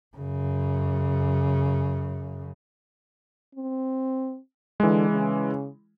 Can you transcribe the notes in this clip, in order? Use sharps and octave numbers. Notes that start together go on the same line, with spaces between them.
F#2 C#3
C4
D3 E3 G#3
C#3